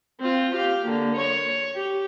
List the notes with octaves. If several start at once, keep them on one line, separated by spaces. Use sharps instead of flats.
C4 F4
G4 F5
D3 A#3
C#5
G4